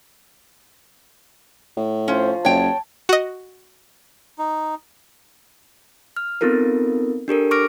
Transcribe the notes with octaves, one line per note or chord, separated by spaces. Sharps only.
A2
F3 C#4 C5
F#1 C#5 G5 A5
F#4 D#5
D#4
F6
B3 C4 D#4 F4 A4 A#4
D4 G4 A4 A#4
C#6 D6 F6 A#6 D7